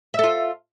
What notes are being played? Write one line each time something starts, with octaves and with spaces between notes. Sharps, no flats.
F4 A4 E5